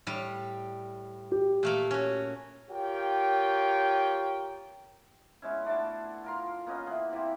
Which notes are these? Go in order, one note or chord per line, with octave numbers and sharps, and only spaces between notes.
A2 G3
G4
A#2 A3 A#3
C#4 F#4
F4 G4 A#4 C#5 G5
G#3 B3 C#4 E4
A3 D4 F#4 A5
F4 A#4 C6
A#3 B3 C#4 D#5
E3 G#4 F#5 C6
E3 C4 G4